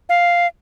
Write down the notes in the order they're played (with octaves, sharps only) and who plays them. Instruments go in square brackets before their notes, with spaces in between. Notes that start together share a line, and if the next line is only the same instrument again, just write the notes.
[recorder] F5